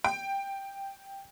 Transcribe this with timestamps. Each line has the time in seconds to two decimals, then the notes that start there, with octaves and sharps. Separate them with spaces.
0.04 G5